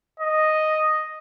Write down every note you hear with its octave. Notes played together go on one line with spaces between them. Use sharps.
D#5